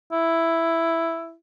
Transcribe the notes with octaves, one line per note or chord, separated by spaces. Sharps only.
E4